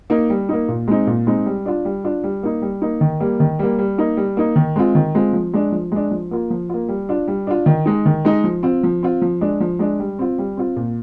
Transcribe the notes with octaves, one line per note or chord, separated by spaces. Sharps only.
A#3 D#4
G3
A#3 D#4
A#2
G#3 C4 D#4
A#2
G#3 C4 D#4
G3
D4 F4
G3
D4 F4
G3
A#3 D#4
G3
A#3 D#4
D#3
G3 A#3
D#3
G3 A#3
G3
A#3 D#4
G3
A#3 D#4
D#3
G#3 C4 F4
D#3
G#3 C4 F4
F3
G#3 D4
F3
G#3 D4
F3
A#3 F4
F3
A#3 F4
G3
D4 F4
G3
D4 F4
D#3
G#3 D#4
D#3
G#3 D#4
F3
C4 F4
F3
C4 F4
F3
G#3 D4
F3
G#3 D4
G3
C4 F4
G3
C4 F4
A#2